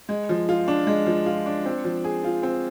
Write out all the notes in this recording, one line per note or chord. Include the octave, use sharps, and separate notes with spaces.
G#3
F3
F4
D4
G#3
F3
F4
D4
C4
F3
G#4
F4
C4